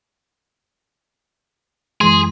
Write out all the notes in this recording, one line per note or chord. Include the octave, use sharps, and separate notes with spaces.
F#2 E3 G#3 G#4 C6